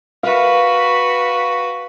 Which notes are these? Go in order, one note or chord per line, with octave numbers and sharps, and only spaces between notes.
F#4 B4 F5